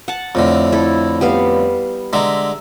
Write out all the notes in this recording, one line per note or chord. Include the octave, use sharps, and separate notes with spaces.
F#5 A5
F2 A2 D3
E4 A4
G3 B3 F5
D3 G#3 E5 A#5